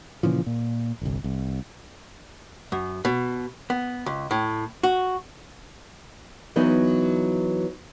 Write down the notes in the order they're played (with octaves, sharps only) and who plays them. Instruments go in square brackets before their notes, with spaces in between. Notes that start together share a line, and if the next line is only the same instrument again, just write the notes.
[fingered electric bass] A#2 C#3 E3 F3
A#2
G1 C2
C2
[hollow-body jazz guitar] F#2
B2
B3
C#2
A2
F#4
[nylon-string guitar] E3 F#3 B3 D#4